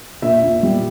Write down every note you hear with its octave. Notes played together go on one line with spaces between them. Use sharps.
A#2 E5
A#2
G3